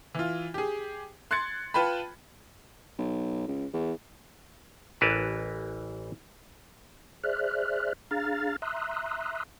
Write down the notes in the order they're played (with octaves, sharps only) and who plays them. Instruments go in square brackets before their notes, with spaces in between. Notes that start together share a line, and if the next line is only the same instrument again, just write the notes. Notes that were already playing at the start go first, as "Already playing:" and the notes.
[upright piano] E3 F4
G4 G#4
C6 F#6 G#6 A6 C#7
F4 B4 G5 A5 B5
[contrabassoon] B1
C#2
E2
[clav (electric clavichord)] A1 E3 A#4 B4 A5
[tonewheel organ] G#4 C5 D5 E5 F6 F#6
D4 G#4 F5 A#5 F6 A6
E5 A#5 C6 D#6 E6 F#6